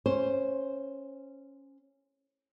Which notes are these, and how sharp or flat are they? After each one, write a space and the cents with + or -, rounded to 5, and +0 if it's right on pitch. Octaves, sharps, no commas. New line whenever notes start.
C#4 -10 C5 +0